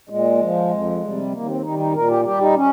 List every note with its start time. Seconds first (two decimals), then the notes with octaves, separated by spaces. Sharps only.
0.09 A#2 G#3
0.41 F3
0.71 F2
1.02 C3 G3
1.33 D#2 A#3
1.48 C4
1.63 D#3 G3 D#4
1.79 D#4
1.94 A#2 A#4
2.09 G4
2.24 G3 G4
2.41 D#4
2.56 C#4